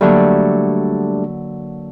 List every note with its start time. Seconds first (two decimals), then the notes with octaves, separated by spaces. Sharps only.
0.01 D3 F#3 G3 A3 A#3 D4